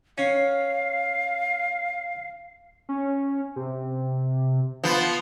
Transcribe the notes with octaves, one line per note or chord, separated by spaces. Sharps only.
C#4 F5
C#4
C3
F3 B3